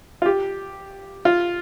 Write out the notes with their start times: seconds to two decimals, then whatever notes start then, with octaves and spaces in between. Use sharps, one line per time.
0.22 F4
0.26 G4
1.25 F4